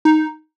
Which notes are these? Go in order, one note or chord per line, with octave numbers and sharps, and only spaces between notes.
D#4